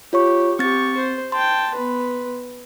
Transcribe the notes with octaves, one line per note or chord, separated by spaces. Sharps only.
F4 G4 C#5 C#6
C4 G4 C#6 A6
C5
G5 A5 C6
B3 B4